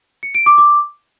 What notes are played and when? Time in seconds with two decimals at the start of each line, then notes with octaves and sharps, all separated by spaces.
0.23 C#7
0.35 D7
0.46 D6
0.58 D6